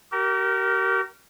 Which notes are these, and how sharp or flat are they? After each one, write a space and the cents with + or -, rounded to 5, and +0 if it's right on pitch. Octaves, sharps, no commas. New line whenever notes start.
G4 -40 A#4 +0